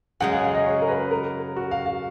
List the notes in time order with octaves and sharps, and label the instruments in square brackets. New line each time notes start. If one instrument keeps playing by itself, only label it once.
[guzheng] F#2 C#3 G#3 [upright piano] F#5
[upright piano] F5
F5
D#5
C#5
A#4
B4
A#4
F#4
F5
F5